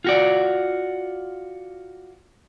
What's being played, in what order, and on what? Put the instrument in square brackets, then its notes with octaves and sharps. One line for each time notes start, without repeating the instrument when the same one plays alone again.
[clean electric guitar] F4 F#4 D5